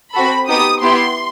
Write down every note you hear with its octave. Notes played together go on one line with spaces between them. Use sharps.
C4 F#4 A4 B5
B3 D#4 G4 D#6
B3 E4 G4 C6